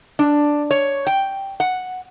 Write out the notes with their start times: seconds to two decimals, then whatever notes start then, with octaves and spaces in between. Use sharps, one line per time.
0.19 D4
0.71 C#5
1.07 G5
1.60 F#5